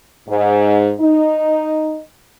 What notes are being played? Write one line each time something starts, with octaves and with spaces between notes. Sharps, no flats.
G#2
D#4